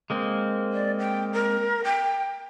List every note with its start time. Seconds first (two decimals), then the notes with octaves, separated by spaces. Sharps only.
0.10 G#3 A#3 C4
0.72 D5
0.99 G5
1.33 A#4
1.84 G5